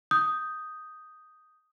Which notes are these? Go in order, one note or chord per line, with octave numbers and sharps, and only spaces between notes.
D#6 G6